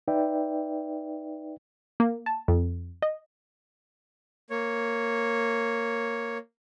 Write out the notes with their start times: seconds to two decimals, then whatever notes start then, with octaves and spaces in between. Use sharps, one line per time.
0.08 D#4 B4 D5 E5 G5
2.00 A#3
2.26 A5
2.48 F2
3.02 D#5
4.50 A#3 C#5